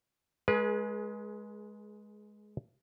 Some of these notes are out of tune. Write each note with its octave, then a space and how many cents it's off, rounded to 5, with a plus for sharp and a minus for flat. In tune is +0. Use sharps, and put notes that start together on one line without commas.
G#3 +10 G#4 +25 B4 -30